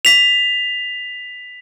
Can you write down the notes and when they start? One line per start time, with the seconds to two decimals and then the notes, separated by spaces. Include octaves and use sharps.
0.05 B6 F7